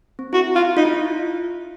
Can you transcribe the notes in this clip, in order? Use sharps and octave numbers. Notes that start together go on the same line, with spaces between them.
C4
E4 F#4
F4
D#4 F4
E4